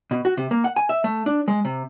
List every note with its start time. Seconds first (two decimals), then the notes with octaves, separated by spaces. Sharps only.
0.11 B2
0.25 F#4
0.37 C3
0.51 A#3
0.64 F#5
0.76 G#5
0.89 E5
1.04 A3
1.26 D4
1.48 G#3
1.65 C3